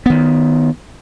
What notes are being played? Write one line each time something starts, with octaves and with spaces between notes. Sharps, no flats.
D#3 B3